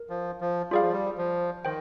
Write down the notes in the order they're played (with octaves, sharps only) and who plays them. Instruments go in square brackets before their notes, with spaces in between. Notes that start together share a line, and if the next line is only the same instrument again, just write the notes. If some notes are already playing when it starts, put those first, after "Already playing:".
Already playing: [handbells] A#4
[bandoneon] F3
F3
[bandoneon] G3 [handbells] F4 G#4 D5 F5
[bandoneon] F3
G3
F3
[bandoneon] D#3 [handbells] C5 G5